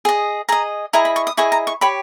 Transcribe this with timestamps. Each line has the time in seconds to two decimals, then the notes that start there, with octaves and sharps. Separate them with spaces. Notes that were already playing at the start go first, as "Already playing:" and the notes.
0.05 G#4 D#5
0.49 G#4 D#5 A#5
0.93 E4 G#4 D#5 A#5
1.05 B5
1.16 C#6
1.27 D#6
1.37 E4 G#4 D#5 C#6
1.52 A#5
1.67 C#6
1.81 G4 C#5 B5